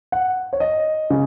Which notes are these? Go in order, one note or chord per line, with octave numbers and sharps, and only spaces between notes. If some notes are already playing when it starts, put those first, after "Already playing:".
F#5
C#5
D#5
C#3